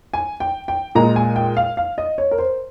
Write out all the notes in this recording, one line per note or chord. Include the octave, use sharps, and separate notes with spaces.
G#5
G5
G5
A#2 G#3 A#5
G#5
G5
F5
F5
D#5
C#5
A#4
C5